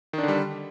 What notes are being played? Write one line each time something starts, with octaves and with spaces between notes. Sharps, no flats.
D3 D#3 G3 D4